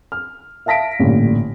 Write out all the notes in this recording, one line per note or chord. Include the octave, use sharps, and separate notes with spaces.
F6
E5 F5 A5 A#6 B6 D7
A1 G2 A#2 D3